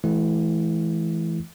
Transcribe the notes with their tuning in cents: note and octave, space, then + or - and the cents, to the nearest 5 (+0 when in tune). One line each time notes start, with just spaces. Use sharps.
E3 +0 A3 -45 E4 +0